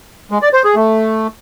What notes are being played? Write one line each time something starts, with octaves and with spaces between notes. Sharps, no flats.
G#3
D5
C5
G#4
A3